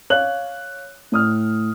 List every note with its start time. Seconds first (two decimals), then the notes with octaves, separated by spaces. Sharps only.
0.10 C#5 F5 F#6 F#7
1.12 A2 D#6 F6